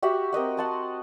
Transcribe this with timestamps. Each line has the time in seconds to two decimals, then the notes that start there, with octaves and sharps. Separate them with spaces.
0.02 F#4 G4 E5 F#5
0.33 C4 A#4 D#5 F#5
0.57 F#5 A5 C6